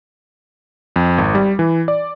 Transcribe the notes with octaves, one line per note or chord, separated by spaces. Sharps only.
F2
G#1
G3
E3
D5